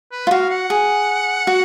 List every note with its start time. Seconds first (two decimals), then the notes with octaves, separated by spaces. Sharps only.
0.12 B4
0.27 F4
0.31 F#4 F5
0.50 F#5
0.70 G#4
1.47 F#4